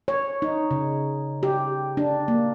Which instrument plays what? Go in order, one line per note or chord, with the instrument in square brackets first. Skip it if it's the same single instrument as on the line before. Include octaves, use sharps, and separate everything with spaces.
[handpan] C#5
D#4
C#3
G4
D4
A#3